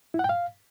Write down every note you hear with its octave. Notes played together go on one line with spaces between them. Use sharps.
E4
F#5
G5
F5